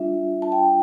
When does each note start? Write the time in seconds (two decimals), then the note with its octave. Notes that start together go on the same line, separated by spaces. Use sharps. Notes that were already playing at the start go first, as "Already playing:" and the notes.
Already playing: G3 D4 F4 E5
0.42 A5
0.52 G5